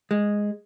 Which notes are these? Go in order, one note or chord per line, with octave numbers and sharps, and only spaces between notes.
G#3